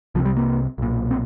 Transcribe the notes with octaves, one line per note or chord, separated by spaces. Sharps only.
C2 C3 F3
G3
A#3
B1 A#2
C4